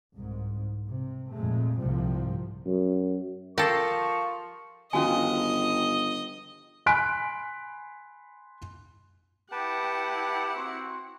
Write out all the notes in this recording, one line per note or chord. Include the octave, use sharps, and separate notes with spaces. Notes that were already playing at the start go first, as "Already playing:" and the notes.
C2 G#2
C3
F2 A#2 G#3 A3
C2 G#2 C3 F3 G3
F#2
F3 G4 A4 A#4 C#6 A#6 C7
G1 D#3 F3 G#3 C#4 F#4 D#5 G#5
G#5 B5 C6 F#6 B6 D7
E4 G4 B4 F#5 G5 A5
C4 F#4